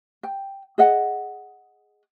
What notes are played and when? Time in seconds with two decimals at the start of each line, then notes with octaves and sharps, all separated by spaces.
0.23 G5
0.78 G#4 D#5 F#5